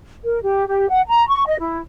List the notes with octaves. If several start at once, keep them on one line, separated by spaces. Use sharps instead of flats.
A#4
G4
G4
F#5
A#5
C#6
D#5
E4